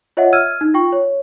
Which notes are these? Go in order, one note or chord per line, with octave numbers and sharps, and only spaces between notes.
F4 C#5 D#5 E5 F#5
E6 F6 G#6 D#7
D#4
F4 G5 C#6
C#5